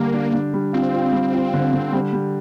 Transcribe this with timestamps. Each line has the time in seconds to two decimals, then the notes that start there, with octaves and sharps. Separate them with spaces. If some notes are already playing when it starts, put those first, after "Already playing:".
Already playing: D3 G3 A#3 D4
0.13 D4
0.33 D4
0.54 G3
0.73 C4 F4
0.94 F4
1.13 G3
1.33 F4
1.54 D3
1.73 D3
1.93 G3
2.13 G3